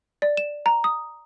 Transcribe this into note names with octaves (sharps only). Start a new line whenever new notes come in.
D5
E7
A#5
D#6